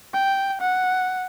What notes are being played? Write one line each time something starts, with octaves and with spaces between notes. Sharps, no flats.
G5
F#5